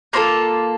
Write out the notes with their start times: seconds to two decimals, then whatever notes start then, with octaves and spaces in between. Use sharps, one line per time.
0.13 A#3 F4 A4 C5